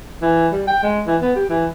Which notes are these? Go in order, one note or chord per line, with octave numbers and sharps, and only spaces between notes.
E3
G3
G5
G#3
E3
B3
G4
E3